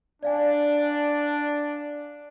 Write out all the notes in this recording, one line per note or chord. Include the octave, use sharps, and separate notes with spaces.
D4 D5 F5 G#5